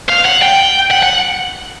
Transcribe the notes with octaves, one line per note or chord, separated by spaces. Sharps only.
F5
F#5
G5
F#5
F#5